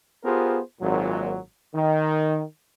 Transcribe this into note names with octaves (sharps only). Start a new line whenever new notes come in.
B3 F4 G4 G#4 A#4 C5
G#1 A#2 F#3
D#3